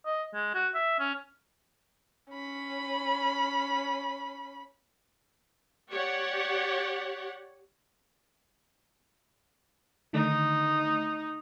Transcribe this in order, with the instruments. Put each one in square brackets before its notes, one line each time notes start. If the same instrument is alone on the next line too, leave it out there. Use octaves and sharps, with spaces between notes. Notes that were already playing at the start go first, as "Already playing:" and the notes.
[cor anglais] D#5
G#3
F#4
E5
C#4
[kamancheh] C#4 B5
[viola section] G4 C#5 D5 F#5
[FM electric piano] D3 D#3 A3 [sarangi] D#4